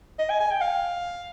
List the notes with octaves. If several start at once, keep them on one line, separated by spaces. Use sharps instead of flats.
D#5
G#5
G#5
G5
F5